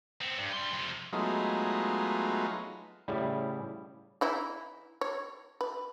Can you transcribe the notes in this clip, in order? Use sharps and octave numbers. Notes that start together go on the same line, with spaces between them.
B3 C4
G2
G3 C6
F2 C3
F#3 G#3 A3 B3 D#4 F4
A2 C#3 G3 E4
E3 D#4 E4
C#5
B4